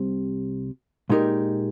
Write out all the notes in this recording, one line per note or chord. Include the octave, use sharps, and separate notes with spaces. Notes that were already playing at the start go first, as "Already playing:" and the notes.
Already playing: C2 C3 G3
A#2 G#3 D#4 G4 A#4